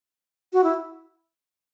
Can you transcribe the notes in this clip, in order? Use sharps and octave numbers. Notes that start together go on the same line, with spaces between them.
F#4
E4